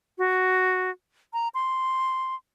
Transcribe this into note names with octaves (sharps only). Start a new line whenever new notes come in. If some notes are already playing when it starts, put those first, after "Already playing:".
F#4
A#5
C6